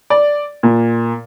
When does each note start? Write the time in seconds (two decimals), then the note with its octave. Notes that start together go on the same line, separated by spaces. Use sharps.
0.10 D5
0.63 A#2